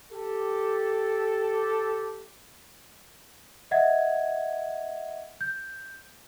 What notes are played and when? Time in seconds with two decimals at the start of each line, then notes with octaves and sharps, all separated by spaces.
0.11 G4 A4
3.71 D#5 E5 F#5 G#6
5.41 G6